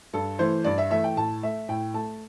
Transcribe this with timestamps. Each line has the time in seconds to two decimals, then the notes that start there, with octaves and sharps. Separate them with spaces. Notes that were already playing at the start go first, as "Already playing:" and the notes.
0.13 G2 A4
0.39 E3 A3 C5
0.64 G2 D5
0.78 E5
0.90 E3 A3 E5
1.04 G5
1.16 A2 A5
1.43 A3 E5
1.69 A2 G5
1.94 A3 A5